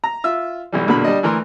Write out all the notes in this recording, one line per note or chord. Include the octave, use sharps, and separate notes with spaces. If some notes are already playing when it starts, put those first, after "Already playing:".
A#5
F4 E5 E6
B1 E3 G3
B1 E2 A#2 D3 F#4 B5
G3 D4 D5 D#5
D2 E3 A#4 C6